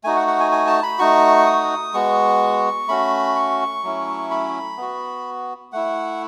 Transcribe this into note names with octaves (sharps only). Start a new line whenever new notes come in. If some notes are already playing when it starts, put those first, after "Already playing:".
A3 D#4 F#4 G#5
F#5
F#5
G#5
G#5
A5
B5
A3 D#4 F#4 C#6
D#6
G#3 B3 F#4 C#6
A3 C#4 F#4 B5
C#6
F#3 A3 C#4 E4
B5
B3 F#4
A3 E4 F#5